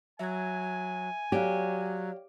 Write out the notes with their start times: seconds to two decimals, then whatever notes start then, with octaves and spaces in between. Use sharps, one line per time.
0.19 F#3 E5 G#5 G#6
1.32 F#3 G4 C#5 D5 F5